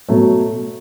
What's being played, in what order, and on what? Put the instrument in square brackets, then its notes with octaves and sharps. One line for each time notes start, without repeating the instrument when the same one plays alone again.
[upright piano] B2 F#3 A3